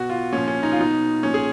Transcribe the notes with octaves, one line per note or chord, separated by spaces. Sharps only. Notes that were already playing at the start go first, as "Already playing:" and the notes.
Already playing: B2 F#4
F4
A#2 F3 C#4
C#4
D#4
F4
B2 D#4
A#2 F3 C#4
G#4